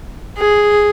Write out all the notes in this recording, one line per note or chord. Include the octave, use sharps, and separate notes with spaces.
G#4